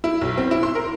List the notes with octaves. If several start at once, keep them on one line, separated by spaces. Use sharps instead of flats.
E4
B1
C4
E4
C6
A#4